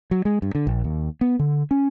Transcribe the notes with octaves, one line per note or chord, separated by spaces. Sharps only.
F#3
G#3
G2
D3
A#1
D#2
B3
D3
C#4